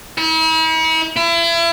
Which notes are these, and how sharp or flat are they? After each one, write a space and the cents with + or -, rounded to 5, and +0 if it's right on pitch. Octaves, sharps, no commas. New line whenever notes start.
E4 -45
E4 +35